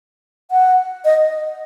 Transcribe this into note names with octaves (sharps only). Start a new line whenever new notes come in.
F#5
D#5